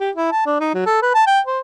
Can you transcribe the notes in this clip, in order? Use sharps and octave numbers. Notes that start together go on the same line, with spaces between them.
G4
E4
A5
D4
D#4
F#3
A4
B4
A5
G5
C5